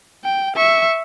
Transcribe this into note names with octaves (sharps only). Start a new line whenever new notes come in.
G5
E5 C#6